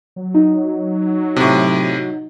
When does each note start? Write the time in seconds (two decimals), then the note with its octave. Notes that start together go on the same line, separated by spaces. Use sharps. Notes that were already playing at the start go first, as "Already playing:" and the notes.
0.16 F#3
0.34 D#4
1.36 A2 C3